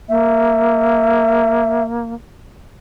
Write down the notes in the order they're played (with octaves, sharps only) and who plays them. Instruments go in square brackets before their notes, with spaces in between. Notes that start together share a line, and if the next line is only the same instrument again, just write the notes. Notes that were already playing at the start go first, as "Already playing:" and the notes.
[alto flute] A#3 [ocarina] E5